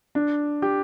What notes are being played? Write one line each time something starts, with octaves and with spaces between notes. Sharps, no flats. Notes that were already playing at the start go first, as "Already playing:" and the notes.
D4
G4